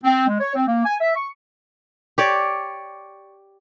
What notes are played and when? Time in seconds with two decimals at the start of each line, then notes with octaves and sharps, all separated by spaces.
0.04 C4
0.28 G#3
0.39 C#5
0.55 C4
0.68 A#3
0.85 G#5
1.00 E5
1.16 C#6
2.18 G4 C#5 D5